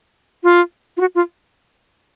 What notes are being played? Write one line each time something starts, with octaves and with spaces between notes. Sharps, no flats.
F4
F4
F#4
F4